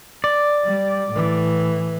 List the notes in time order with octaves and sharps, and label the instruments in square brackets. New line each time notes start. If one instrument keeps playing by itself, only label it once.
[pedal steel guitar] D5
[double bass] G3
A2 E3